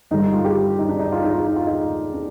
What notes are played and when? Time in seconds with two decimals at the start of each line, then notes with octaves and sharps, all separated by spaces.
0.11 G2 D3 G3 D#4
0.34 F4
0.45 G4
0.79 D#4
0.89 D4
0.99 D#4
1.12 F4
1.24 D#4
1.34 F4
1.47 D#4
1.56 F4
1.67 D#4
2.14 D4